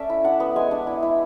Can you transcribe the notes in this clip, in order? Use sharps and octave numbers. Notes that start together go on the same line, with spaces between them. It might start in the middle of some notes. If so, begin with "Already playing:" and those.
Already playing: C#4 A4 D5 E5
E4
D4 F#5
B3
G#3 G#5
D4
E4
E4